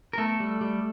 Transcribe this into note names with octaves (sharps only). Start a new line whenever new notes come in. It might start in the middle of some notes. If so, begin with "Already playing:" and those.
A#4
A3 B3 A4
G3
G3